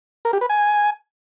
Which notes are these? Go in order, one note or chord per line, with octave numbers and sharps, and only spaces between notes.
A#4
G4
B4
G#5